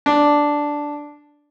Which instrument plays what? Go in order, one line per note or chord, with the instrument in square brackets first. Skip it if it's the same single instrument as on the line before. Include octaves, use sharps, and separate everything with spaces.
[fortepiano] D4